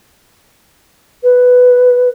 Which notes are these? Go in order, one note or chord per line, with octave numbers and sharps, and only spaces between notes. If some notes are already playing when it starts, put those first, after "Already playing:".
B4